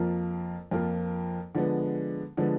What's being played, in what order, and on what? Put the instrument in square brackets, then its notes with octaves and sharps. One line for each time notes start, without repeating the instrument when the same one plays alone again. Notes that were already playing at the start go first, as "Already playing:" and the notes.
Already playing: [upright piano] F2 F3 A#3 F4 A#4
F2 F3 A#3 F4 A#4
D3 F3 G#3 B3
D3 F3 G#3 B3